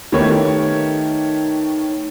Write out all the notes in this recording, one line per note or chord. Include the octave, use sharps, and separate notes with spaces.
D#3 A3 B3 G4 A#4 C#5